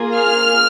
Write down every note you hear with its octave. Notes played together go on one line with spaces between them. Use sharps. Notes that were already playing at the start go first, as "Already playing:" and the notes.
Already playing: A#3 F4 G#4
F6